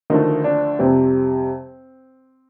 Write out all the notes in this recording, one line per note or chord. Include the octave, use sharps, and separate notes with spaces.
D2 D3 D#3 F3 A3 D#4
D4
F2 C3 G3 C4